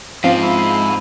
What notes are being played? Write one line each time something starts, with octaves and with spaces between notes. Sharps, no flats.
G#2 F3 C4 F5
E4